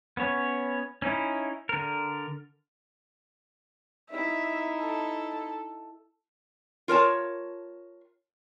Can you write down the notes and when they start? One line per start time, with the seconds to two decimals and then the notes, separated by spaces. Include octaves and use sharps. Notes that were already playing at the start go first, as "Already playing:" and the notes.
0.17 B3 C#4 C#5
1.02 C#4 D#4 E4
1.69 D3 A#4
4.11 D#4 E4 E5
4.81 A4
6.88 F4 A#4 C#5 A5